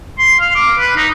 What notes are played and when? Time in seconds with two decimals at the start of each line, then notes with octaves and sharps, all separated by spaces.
0.18 C6
0.40 F5
0.55 D6
0.78 B4
0.97 D#4